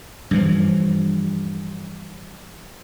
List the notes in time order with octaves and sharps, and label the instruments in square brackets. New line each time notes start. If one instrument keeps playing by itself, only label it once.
[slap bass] G2 E3 F3